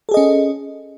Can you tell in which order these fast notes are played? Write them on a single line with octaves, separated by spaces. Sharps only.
A4 G#4 D#5 C#4